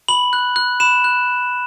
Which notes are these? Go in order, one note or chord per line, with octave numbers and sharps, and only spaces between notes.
B5 F#7
F#6
F#6
B5 E7
F#6